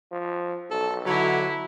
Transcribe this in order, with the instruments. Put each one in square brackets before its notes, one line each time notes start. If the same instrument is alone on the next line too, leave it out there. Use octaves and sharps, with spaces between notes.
[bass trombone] F3
[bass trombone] B1 [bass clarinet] A4
[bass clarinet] D3 [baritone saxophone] F#3 [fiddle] E4